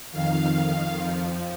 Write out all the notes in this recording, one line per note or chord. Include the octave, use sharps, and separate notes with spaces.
F2 D#3 F5
F2 F3